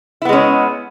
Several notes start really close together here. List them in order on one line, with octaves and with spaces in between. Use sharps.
E4 B3 G#3 C#4